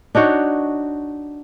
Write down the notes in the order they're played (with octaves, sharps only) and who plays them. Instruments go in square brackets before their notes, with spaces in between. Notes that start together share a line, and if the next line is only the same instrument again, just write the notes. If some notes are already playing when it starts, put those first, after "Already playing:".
[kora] D4 D#4 F#4 C#5